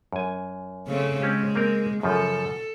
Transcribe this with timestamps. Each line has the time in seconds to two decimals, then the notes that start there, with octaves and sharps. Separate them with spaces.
0.13 F#2 G#5
0.87 C#3 A3 C4
1.22 G#3 C4 C#4 G4
1.55 A#3 C4 A#4
2.03 F#2 C#3 F3 A4